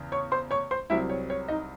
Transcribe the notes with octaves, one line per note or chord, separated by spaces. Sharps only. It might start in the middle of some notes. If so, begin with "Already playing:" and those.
Already playing: E2 C#3
C#5 C#6
C5 C6
C#5 C#6
C5 C6
C2 C3 F#3 C4 E4 E5
C#5
C#5
D#4 D#5